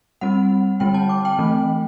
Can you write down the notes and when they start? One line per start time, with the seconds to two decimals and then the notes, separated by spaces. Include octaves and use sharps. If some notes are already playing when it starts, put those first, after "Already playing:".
0.21 G3 C4 F#5
0.80 D3 G3 C4 G5
0.94 A5
1.09 D6
1.25 G5
1.39 E3 A3 C4